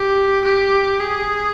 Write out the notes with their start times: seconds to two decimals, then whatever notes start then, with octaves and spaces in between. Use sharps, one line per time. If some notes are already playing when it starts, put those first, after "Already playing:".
Already playing: G4
0.45 G4
1.00 G#4